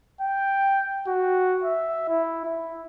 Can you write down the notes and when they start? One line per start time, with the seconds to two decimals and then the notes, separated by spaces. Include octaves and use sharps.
0.21 G5
1.07 F#4
1.64 E5
2.09 E4
2.45 E4